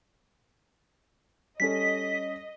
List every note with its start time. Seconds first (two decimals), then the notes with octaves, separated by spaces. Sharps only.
1.60 G3 C#4 A4 D#5 B6